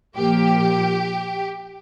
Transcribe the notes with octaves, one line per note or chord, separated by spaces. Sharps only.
A#2 F3 A#3 G4